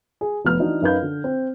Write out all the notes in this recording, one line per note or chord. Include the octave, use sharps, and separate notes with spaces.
G#4
F1 B3 F6
E3 D4 D#4 F#4
F#2 C#4 D#4 B4 F5 G6
D3
C4